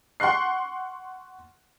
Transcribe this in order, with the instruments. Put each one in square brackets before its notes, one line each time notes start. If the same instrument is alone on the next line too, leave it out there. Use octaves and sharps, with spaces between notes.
[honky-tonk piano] F#5 C6 C#6 F#6 C7